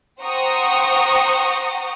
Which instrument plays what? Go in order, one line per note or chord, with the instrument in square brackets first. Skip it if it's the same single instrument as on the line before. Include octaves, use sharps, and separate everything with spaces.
[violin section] C5 F#5 G5 A#5 C#6 D#6